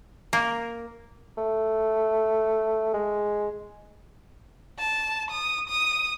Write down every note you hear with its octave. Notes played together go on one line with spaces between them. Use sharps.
A#3
A3
G#3
A5
D#6
D#6